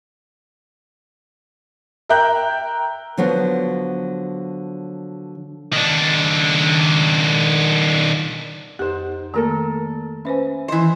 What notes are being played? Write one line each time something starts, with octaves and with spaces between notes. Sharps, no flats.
A#4 E5 G5 A#5 F#6 G6
D3 F3 F#3 B3
D#3 D4
F2 D#4 G4 C5
D#3 A3 A#3 A4 A#4 A#5
C#4 B4 C5 E5 G#5
E3 C5 D#5